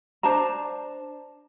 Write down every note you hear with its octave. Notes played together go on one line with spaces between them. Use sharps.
D4 C5 A5 A#5